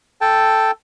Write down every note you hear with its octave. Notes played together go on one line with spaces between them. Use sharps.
A4 G5 A5